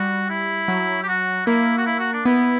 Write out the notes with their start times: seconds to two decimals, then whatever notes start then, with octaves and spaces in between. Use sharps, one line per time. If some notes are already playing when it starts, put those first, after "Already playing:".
Already playing: G3 F#4
0.30 E4
0.68 F#3
1.03 G4
1.08 F#4
1.46 A#3 E4
1.77 F#4
1.86 E4
1.99 F#4
2.13 D4
2.25 B3 E4